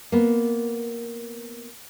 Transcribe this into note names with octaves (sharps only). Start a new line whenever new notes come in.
A#3 B3